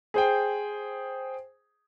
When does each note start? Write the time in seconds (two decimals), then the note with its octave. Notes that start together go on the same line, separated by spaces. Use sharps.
0.14 G#4 C5 G5